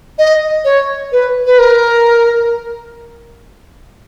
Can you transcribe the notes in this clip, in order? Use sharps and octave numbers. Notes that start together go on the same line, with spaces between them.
D#5
C#5
B4
B4
A#4